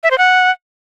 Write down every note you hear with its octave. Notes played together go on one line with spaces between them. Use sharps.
E5
C5
F#5